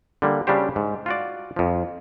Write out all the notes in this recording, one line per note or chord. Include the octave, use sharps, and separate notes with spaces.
D3 G3 A#3
C#3 G3 D4 F#4 G4 C5
G#2
F4 F#4 D5
F2 F3